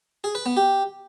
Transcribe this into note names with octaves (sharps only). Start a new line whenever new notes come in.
G#4
B4
B3
G4